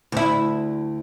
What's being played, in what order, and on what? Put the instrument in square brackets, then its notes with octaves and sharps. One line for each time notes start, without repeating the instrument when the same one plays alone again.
[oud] D2 E4